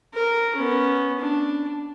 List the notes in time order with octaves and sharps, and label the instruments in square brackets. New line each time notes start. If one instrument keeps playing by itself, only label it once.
[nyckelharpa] A#4
B3 C#4
D4